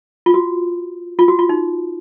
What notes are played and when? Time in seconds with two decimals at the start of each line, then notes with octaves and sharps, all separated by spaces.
0.26 F4
0.34 F#4
1.19 F4
1.28 F#4
1.39 F4
1.49 D#4